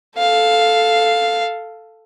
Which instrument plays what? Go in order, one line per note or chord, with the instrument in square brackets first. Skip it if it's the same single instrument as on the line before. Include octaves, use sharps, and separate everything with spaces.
[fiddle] A4 F5